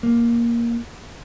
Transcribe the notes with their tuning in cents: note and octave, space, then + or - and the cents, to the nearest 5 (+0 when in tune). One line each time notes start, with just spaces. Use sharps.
A#3 +10